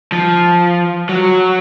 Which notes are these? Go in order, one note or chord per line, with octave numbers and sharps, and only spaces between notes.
F3
F#3